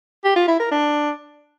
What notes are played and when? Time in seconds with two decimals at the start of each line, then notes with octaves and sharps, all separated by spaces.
0.24 G4
0.36 F4
0.48 E4
0.60 A#4
0.71 D4